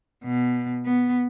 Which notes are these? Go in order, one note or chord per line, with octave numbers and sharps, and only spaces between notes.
B2
B3